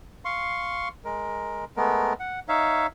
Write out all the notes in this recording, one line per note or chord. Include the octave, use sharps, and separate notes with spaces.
F5 C6 C#6
G#3 A#4
G#3 A3 B3 A#4
F#5
D#4 C#5 E5 F5